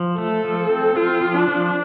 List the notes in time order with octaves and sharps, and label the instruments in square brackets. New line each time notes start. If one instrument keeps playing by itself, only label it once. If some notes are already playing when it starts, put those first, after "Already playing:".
Already playing: [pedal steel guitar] F3
[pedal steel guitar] A3 [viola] A4
[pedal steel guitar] F3
C4
[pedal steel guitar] C4 [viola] F4
[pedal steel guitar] F3
[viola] D4
[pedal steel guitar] F3